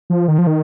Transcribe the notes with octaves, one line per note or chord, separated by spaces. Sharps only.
F3
D#3
F3
D#3